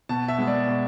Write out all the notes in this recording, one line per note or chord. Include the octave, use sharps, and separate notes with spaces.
B2 A5
E5
G#3 B3
D5
B2